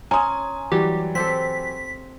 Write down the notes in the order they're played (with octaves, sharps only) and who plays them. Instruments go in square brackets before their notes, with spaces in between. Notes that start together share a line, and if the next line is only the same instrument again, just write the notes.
[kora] C#4 [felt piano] G#5 D#6 [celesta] A#5 C6
[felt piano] E3 F#3 [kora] G3 [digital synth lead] G4
[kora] C4 G4 A4 [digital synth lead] B6